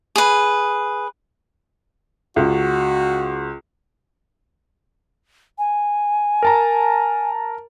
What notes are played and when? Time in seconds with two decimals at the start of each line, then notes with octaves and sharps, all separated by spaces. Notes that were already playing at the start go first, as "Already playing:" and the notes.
0.16 G#4 B4
2.36 C#2 F#4
5.59 G#5
6.43 A#4 A5 A#5